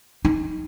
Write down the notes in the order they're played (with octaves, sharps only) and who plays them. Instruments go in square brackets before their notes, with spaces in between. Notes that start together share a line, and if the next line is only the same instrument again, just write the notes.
[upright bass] D#4